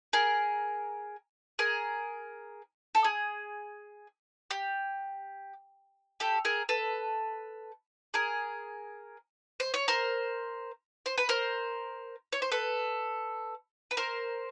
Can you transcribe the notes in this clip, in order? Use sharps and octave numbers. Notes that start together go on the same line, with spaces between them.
G#4 A#4
G#4 A#4
A4
G#4
G4
G4 A4
G#4 A#4
A4 B4
G#4 A#4
C5
C#5
A#4 C5
C5
B4
A#4 C5
C#5
C5
A4 B4
B4
A#4 C5